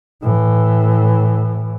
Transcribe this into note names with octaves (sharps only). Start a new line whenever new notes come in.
A2 E3